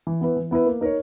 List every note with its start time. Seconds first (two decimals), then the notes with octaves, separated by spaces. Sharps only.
0.07 E3
0.21 B3 E4 B4
0.37 E3
0.51 B3 E4 B4
0.66 A#3
0.81 D#4 A#4 C#5